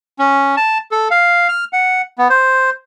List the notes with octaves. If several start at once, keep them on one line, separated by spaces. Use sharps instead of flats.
C#4
A5
A4
F5
F6
F#5
B3
C5